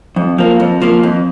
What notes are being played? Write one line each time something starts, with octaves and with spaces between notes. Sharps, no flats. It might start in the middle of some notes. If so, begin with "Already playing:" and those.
F2
F3 A#3
F2
F3 A#3
F2